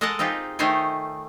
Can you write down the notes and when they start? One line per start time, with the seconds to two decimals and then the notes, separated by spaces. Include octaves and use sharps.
0.01 G#3 A4 A#4 D#5 F#5 A5
0.19 C4 D#4 F4 G4 G#4
0.59 D#3 A3 D#4 C5 C#5 G#5